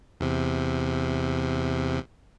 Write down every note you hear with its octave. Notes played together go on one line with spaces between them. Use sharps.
E2 C3